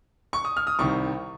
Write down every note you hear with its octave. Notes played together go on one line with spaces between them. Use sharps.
C#6
D#6
F6
D#6
C2 C3 D#3 C#6